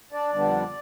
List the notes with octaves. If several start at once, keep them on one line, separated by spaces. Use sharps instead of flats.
D4 D5
F2 D3 G3 B3 D4